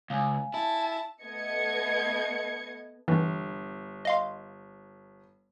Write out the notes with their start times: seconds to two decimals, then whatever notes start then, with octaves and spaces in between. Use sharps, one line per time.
0.10 C#2 F5 G#5
0.54 E4 A5
1.22 A3 B3 D#5 G#6 C#7
3.08 G1 E3
4.05 D#5 F5 C6